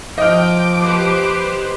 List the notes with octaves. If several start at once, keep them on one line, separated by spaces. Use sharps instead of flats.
F3 D#5 G5 D6 F6
G4 B4 C5